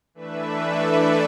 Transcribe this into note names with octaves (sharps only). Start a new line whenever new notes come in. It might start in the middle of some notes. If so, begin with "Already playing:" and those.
E3 A3 D4 B4 E5
A4 D5